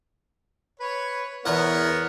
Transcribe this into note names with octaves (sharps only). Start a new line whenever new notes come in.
B4 C#5
E2 B3 A#4 C#5 F#5